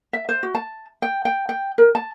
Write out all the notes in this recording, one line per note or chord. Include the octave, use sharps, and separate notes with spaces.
E5
C5
F#4
A5
G5
G5
G5
A#4
A5